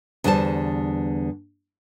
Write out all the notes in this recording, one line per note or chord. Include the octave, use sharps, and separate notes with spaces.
E2 D3 G3 C5 D#5 A5